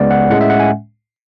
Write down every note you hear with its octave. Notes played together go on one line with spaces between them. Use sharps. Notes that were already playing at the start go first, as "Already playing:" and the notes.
Already playing: C#2 C#3 G#3 B3 D5
F#5
A2 G#3 C#4 F#5
E5
F#5
G#5